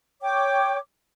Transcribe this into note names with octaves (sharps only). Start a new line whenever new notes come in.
C#5 G5 D6